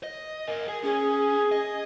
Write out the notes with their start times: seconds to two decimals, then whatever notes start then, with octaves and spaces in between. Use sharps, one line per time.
0.03 D#5
0.47 A#4 G#5
0.68 G#4 G#5
0.83 C#4 G#4
1.52 D#5